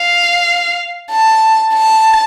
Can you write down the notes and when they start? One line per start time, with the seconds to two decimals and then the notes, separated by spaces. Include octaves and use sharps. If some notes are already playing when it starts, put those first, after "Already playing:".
Already playing: F5
1.11 A5
1.74 A5